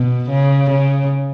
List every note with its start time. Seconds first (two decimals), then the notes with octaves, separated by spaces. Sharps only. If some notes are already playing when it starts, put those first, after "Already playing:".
Already playing: B2
0.30 C#3
0.70 C#3